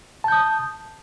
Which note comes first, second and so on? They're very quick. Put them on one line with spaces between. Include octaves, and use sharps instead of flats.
A5 G6 D#6